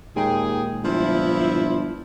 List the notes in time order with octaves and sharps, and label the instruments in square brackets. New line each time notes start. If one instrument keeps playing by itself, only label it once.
[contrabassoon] D#2 [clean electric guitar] A#2 G#3 G5 [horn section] D#4 G#4
[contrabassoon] G1 [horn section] F3 E4